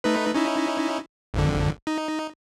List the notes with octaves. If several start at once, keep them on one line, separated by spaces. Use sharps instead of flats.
A3 D#4 B4
C#4 D#4 E4
G#1 F2 D3
D#4